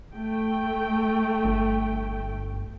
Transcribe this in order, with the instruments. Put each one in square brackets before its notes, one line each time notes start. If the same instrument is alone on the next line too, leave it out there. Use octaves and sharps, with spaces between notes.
[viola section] A3 G5
[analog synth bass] G1